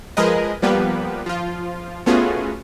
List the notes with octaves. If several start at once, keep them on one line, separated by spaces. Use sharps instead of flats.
F3 G#3 G#4 A#4 B4 D#5
F3 G3 A#3 B3 G4 B4
F3 F4
A3 B3 C#4 F4 F#4 G#4